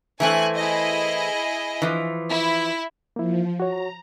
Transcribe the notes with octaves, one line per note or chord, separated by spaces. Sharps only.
E3 A3 C4 G#5 C#6 F#6
E4 G#4 D#5
E3 F3
E4
F3 A#3 E4
F#4 C#5 A#5